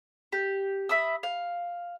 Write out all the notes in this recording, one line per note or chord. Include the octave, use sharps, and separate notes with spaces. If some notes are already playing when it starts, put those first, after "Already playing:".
G4
E5 B5 D#6 E6
F5